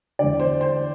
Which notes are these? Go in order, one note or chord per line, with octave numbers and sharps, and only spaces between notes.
E2 D3 D5
C5
C5